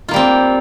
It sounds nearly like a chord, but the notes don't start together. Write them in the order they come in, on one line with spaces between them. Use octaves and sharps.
F4 A#3 G3 C4